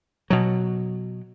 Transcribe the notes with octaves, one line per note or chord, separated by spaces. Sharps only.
B2 F#3